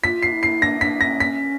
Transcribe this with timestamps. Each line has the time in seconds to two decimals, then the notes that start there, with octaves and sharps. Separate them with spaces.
0.04 F4 B6
0.23 C7
0.33 E4
0.43 C7
0.62 D4 A#6
0.81 D4 B6
1.01 C#4 A#6
1.20 B6